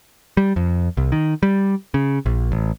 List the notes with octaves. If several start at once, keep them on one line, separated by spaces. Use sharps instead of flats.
G3
F2
C2
D#3
G3
C#3
A#1
A1